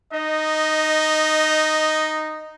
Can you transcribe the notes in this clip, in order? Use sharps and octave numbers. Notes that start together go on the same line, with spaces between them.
D#4 D#5